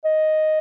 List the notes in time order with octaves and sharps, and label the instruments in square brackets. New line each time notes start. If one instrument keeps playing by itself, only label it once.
[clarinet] D#5